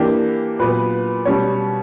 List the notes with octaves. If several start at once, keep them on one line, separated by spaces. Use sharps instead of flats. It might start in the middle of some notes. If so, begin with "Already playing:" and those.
Already playing: E3 A#3 D4 G4
A#2 F#3 B3 B4
B2 G3 C#4 C#5